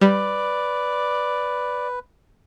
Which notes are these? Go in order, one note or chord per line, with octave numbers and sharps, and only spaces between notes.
G3 B4 D5